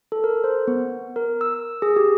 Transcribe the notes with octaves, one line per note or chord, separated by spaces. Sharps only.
A4
A#4
C5
B3
A#4
E6
G#4
G4